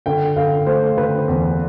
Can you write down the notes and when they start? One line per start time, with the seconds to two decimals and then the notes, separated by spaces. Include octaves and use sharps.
0.06 D3 G5
0.36 D3 F5
0.67 A3 C5
0.97 D3 B4
1.28 E2